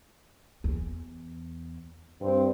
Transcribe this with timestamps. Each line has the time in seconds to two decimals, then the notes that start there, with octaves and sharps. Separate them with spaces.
0.64 E2
2.21 G2 C4